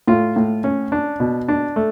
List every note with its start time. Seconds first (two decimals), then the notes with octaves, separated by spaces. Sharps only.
0.08 A2 F4
0.36 A2
0.64 C#4
0.92 D4
1.20 B2
1.48 D4
1.76 A3